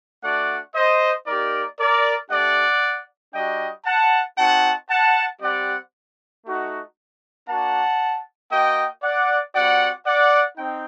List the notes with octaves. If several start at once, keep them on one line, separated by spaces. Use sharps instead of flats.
A3 D4 F#4 D5 F#5
C5 D#5
A#3 D#4 G4 A#4 D5
A#4 D5
A3 D4 G4 D5 F#5
G3 D4 F#4 D#5 G5
F#5 A5
C4 D#4 F#4 F#5 A5
F#5 A5
G3 C4 G4 D5 F#5
A3 D#4 F#4
A#3 D4 F#4 F#5 A5
A#3 F#4 D#5 G5
D5 F#5
G3 C4 F#4 D5 F#5
D5 F#5
C4 D#4 G5